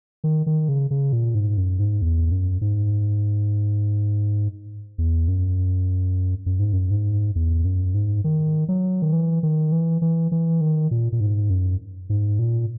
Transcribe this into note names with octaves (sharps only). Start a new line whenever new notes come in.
D#3
D#3
C#3
C#3
A#2
G#2
F#2
G#2
E2
F#2
G#2
E2
F#2
F#2
G#2
F#2
G#2
E2
F#2
G#2
D#3
F#3
D#3
E3
D#3
E3
E3
E3
D#3
A#2
A#2
G#2
F#2
G#2
A#2